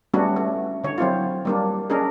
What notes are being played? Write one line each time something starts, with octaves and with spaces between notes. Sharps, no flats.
G3 A3 B3 C#4 D4 F#4
A3
D3 C#5
F#3 C4 E4 F4
G3 A#3 D4
C#4 D4 G#4 A#4